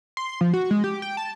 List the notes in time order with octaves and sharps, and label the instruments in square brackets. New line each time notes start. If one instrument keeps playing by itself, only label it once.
[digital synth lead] C6
F3
F#4
G#3
G4
G5
A5